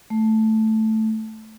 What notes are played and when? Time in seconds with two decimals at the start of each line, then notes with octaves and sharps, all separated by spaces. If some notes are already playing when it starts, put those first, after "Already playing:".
0.10 A3